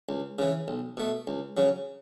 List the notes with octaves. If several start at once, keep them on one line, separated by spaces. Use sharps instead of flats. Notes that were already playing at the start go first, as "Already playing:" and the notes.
C#2
C#3 E3
B1
B2 A3
C#2
C#3 F#3